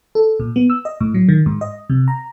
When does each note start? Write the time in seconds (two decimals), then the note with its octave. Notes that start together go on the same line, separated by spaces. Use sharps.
0.15 A4
0.40 A#2
0.56 B3
0.70 E6
0.85 D#5
1.00 A2
1.14 F#3
1.29 D#3
1.46 G#2
1.61 D#5
1.90 C3
2.08 A#5